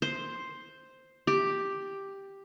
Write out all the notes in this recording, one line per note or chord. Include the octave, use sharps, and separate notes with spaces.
C5
G4